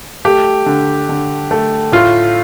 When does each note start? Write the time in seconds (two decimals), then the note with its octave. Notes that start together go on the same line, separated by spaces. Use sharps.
0.25 A3 G4
0.66 D3
1.09 D3
1.51 A3
1.92 A2 F4